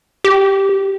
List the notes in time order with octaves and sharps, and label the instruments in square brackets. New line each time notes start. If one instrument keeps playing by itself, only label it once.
[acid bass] G4